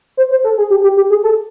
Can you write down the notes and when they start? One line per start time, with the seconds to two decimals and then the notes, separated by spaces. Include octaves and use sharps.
0.17 C5
0.31 C5
0.44 A4
0.58 G#4
0.70 G4
0.84 G4
0.97 G4
1.10 G#4
1.23 A4